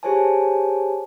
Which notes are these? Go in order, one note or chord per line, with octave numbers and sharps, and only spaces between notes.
G4 G#4 C5 C#5 G#5 A5